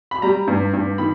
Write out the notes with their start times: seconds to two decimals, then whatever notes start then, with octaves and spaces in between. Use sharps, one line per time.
0.11 B5
0.22 G3 A#5
0.47 G2
0.73 G2
0.98 D#3 B5